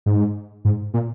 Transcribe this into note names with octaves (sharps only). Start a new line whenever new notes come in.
G#2
G#2
A#2